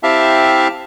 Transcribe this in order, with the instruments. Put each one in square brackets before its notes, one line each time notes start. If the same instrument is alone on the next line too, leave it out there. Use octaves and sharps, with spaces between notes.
[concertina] C4 E4 G4 E5 F5 A5